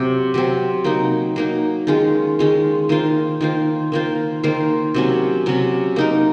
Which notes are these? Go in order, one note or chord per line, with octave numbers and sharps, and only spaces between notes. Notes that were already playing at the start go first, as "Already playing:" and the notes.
Already playing: C3 F#3 C4
C3 F#3 C4
F#3 A#3 D#4
F#3 A#3 D#4
D#3 G#3 C#4 F4
D#3 G#3 C#4 F4
D#3 A#3 F4 C5
D#3 A#3 F4 C5
D#3 A#3 F4 C5
D#3 A#3 F4 C5
C3 F#3 C#4
C3 F#3 C#4
A#3 D#4 A#4